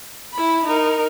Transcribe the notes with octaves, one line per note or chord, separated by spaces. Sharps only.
E4 B5
D#4 A#4